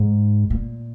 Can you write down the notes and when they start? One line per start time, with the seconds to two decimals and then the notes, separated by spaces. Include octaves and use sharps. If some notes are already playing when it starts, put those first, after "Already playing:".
Already playing: G#2
0.50 A#2